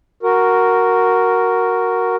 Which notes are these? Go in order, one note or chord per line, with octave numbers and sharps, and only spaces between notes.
F#4 A#4